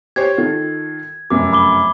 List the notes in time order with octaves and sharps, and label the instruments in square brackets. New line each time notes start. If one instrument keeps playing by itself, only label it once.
[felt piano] G4 C5 C#5 [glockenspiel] G#6
[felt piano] D#3 F4 A4
[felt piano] F1 F#2 [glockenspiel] D6
[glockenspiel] B5 D6 G7